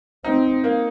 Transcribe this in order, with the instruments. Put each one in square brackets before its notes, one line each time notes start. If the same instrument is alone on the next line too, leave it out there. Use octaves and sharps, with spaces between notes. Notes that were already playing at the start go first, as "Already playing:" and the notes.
[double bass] C4 [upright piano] D#4
[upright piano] A#3